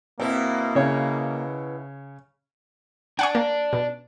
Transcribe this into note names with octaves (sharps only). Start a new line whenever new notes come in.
B2 A#3 C4 E4
C#3 C#5
D4 F#5 G#5 C#6
A#3
B2